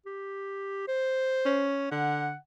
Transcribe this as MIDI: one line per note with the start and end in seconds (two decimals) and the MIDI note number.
0.06 0.86 67
0.88 1.69 72
1.46 1.87 61
1.92 2.33 50
1.92 2.36 78